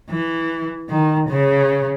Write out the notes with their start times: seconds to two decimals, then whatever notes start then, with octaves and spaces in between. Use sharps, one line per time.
0.10 E3
0.89 D#3
1.29 C#3